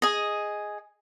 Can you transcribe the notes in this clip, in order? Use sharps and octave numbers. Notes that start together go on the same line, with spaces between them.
G#4 D#5